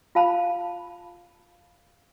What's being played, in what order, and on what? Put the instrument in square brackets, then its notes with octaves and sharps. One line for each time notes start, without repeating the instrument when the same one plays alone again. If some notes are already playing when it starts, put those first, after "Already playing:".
[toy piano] F4 F5 A5 B5